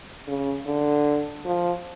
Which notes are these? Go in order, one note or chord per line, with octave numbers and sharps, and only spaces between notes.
C#3
D3
F3